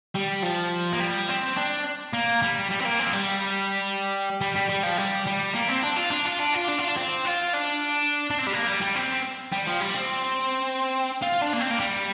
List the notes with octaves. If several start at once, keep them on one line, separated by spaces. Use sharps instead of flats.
G3
F3
A#3
G3
C4
D4
A#3
G3
G3
C4
A#3
C4
F3
G3
G3
G3
G3
F3
G3
G3
A#3
C4
D4
F4
D4
F4
D4
F4
D4
F4
D4
C4
F4
D4
D4
C4
G3
A#3
G3
G3
C4
G3
F3
G3
C4
F4
D4
A#3
C4
A#3
G3